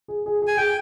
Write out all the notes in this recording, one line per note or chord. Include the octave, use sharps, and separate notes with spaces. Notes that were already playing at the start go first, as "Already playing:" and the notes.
G#4
G#4
G#4
G#5
G#4 G5